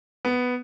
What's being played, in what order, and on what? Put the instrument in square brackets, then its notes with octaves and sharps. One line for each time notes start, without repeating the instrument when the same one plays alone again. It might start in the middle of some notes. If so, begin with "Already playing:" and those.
[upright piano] B3